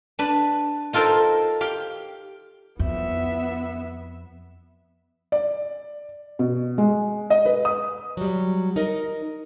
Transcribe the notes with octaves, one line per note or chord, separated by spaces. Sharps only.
D4 B4
D#4 F4 A4 A#4 C5
G4 F5 G5
F2 B3 E5
D5
B2
G#3
D#5
B4
D#6
F#3 G3
D#4 A#4 D#5